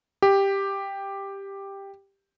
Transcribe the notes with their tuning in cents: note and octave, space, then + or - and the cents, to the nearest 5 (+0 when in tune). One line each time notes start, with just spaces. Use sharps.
G4 +5